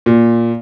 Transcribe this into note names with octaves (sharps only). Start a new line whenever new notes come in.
A#2